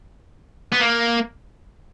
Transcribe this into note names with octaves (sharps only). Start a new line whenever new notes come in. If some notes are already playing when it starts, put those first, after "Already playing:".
B3
A#3